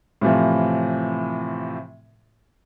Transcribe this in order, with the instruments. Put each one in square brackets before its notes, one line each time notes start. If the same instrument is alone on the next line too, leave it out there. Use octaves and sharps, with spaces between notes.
[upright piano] A2 C3 E3 F3